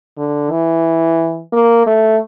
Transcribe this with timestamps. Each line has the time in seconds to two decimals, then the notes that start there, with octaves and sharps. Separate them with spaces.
0.18 D3
0.51 E3
1.53 A#3
1.87 A3